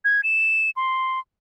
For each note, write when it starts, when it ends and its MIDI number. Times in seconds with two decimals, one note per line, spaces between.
0.05 0.21 92
0.23 0.70 100
0.76 1.19 84